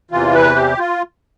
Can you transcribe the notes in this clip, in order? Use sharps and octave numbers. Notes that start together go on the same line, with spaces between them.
E2 C3 E3 F4
B4
G4
F4